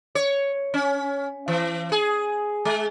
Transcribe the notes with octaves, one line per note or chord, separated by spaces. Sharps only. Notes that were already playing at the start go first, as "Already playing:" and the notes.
C#5
C#4
E3
G#4
G#3